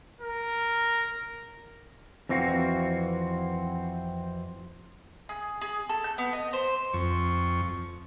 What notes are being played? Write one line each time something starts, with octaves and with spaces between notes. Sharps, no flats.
A#4
F2 E3 C4 F#4 F5
G#4
G#4
A4
G6
B3
D#5
C5
F2 C#6